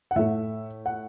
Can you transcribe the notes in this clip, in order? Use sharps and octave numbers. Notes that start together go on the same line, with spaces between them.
F#5
A2 A3 E5
F#5